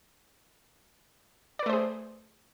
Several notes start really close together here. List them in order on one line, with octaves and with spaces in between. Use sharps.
D5 B4 A3 C5 G#4